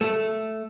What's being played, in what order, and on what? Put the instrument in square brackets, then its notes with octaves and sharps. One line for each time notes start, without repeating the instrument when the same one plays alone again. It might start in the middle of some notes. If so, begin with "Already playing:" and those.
[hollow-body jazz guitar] A3